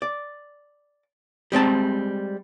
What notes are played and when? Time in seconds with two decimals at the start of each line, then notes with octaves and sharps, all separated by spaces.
0.02 D5
1.52 G3 G#3 C4 A5